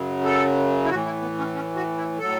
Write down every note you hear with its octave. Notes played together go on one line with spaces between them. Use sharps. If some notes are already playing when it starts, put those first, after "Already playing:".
Already playing: F#2 C#3 F#3
A4
E4
A2 E3 F#4
E4
B3
C#4
C#4
F#4
E4
A2 F#3 A4